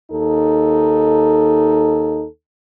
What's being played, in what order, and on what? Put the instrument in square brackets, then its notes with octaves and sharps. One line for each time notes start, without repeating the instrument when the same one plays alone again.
[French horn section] D#2 D#4 A4